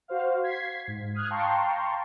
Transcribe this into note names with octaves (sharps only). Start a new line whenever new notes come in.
F#4 C5 F5
G#6 B6 C7
G#2
D#6 F6 F#6 G#6
F5 G5 A5 A#5 C6 C#6